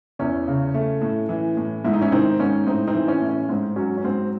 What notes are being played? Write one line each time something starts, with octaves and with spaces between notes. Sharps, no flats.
E2 C#4 E4
C#3
A3
A2
E3
A2
G#2 E4
D#4
C#4 E4
D#3 C4 D#4
G#2 C#4
A2 C4 D#4
C4 D#4
E3
C#4
A2
C#4
G#2 C4
F#3 C#4
C#4
G#2 C4